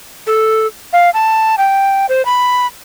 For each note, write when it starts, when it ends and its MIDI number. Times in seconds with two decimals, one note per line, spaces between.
0.27 0.67 69
0.93 1.10 77
1.14 1.55 81
1.58 2.06 79
2.09 2.25 72
2.25 2.66 83